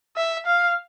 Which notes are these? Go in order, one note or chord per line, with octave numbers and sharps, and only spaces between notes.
E5
F5